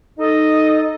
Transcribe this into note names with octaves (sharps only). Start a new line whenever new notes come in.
D#4 A4 D#5